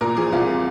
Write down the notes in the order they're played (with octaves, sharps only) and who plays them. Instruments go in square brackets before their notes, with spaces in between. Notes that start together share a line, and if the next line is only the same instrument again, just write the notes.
[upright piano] A#2 A#4
F3 G#4
C2 F4